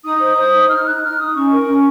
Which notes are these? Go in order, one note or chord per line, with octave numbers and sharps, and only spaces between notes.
D#4 D#6
C5
C5
D#4
D#4 F6
D#4 F#6
D#4 F6
D#4 D#6
C#4 C#6
A#4
C#4